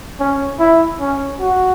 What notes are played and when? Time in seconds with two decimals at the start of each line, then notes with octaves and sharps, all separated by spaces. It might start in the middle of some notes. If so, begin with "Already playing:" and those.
0.20 C#4
0.59 E4
1.00 C#4
1.40 F#4